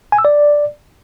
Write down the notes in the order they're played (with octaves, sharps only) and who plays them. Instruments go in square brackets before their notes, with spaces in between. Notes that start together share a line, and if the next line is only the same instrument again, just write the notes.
[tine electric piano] G#5
E6
D5